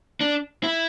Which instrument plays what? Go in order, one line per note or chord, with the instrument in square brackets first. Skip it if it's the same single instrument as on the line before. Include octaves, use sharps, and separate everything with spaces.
[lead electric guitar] D4
E4